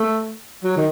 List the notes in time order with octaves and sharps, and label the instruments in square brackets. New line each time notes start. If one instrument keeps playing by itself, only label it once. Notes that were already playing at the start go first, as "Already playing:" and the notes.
Already playing: [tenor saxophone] A3
F#3
D#3